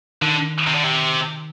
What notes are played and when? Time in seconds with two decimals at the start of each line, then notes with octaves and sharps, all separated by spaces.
0.22 D3 D#3
0.67 C3
0.75 D3
0.84 C3